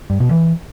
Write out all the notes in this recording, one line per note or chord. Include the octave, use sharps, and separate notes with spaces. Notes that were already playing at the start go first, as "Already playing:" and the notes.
G2
B2
E3